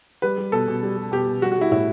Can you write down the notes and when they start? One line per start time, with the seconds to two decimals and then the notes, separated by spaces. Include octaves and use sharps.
0.22 G3 B4
0.38 G3
0.52 B2 A4
0.68 B2
0.83 G3
0.97 G3
1.12 B2 G4
1.27 B2
1.42 G3 F#4
1.52 F#4
1.58 G3 E4
1.72 A2 E4